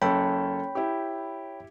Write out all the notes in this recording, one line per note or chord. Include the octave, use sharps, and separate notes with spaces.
F#1 C#4 A4 C#5 G5 B5
E4 G4